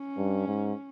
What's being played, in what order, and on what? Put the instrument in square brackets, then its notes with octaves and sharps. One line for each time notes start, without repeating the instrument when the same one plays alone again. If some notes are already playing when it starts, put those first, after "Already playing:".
Already playing: [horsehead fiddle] C#4
[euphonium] G2
G#2